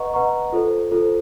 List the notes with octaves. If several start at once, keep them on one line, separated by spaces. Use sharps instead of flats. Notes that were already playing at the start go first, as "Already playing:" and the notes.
Already playing: B4 D#5 F#5 A#5 C#6
B4 D#5 F#5 A#5 C#6
F4 A4 C5
F4 A4 C5